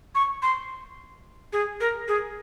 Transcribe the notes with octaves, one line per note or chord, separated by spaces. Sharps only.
C#6
C6
G#4
A#4
G#4